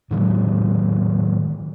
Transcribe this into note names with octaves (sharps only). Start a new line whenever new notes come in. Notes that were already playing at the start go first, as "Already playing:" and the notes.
A2 D#3 F#3 G#3